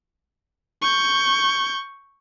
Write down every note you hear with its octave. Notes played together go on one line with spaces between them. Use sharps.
C#6 G6